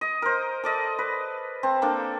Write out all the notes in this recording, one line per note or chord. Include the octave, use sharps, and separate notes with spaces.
D#5
A#4 C5
A4 D5 D#5
B4
C4 A5
A#3 D4 A4